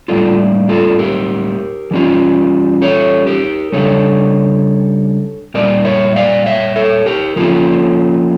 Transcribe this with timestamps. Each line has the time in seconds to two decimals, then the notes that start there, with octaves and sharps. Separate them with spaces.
0.08 A2 G3 A#3 D4 F4 A4
0.69 F4 A4
0.99 G4 A#4
1.91 E3 G3 C#4 F4
2.82 A4 C#5
3.27 G4 A#4
3.72 C#3 G3 D4 A4 C#5
5.54 A#2 G3 A#3 A#4 D5
5.85 C#5 E5
6.16 D5 F5
6.46 C#5 E5
6.76 A4 C#5
7.06 G4 A#4
7.36 F3 A#3 C#4 F4 A4